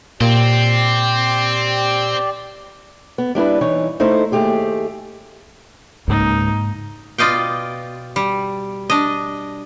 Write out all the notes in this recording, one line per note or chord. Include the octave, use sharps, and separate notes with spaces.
A#2 C4 G4 D5
B3
G3 D4 E4 B4
E3 D#4 C#5
A3 D#4 E4 C5
D#2 A3 G4 G#4
C#2 G#2 A#3 D#4
B2 F4 D5 D#5 F5 G5
G3
D4 D#5